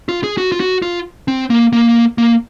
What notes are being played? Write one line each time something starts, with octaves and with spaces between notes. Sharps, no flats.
F4
G#4
F#4
F4
F#4
F4
C4
A#3
A#3
A#3